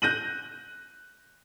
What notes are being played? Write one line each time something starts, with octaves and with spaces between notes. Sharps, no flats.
F#6 G6 A#6 D#7 F#7